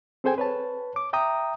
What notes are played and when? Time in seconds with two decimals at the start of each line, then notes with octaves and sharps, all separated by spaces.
0.24 C4 G#4 A4 C5 G5 G#5
0.38 B4 C#5 A5
0.96 D6
1.13 E5 G5 A#5 D#6